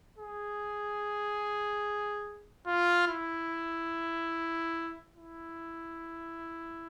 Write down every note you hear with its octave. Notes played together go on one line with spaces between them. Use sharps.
G#4
F4
E4
E4